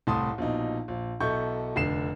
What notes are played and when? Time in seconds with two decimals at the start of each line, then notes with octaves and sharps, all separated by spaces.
0.07 C2 A2 A5 C6 D#6
0.38 A#1 B2 D#4
0.88 A#1
1.20 B1 E4 A4 C#6 G6
1.76 F1 D3 C7 E7